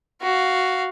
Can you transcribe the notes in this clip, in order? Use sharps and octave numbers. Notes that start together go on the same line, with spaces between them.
F#4 F5